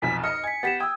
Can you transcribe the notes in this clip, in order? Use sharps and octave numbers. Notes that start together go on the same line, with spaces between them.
F1 B1 F2 G#5 B6
D#5 F6 C#7
G#5 G#6 B6
B3 G4 A6 B6 E7
G5 D#6 E6 G#6